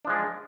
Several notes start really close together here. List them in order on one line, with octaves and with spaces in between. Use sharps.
D4 F3 G#3